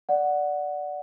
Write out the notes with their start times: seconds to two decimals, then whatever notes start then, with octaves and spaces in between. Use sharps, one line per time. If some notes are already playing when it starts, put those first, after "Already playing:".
0.09 D5 F#5